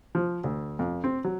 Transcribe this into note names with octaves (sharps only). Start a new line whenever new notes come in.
F3
D2
F2
C4
F#3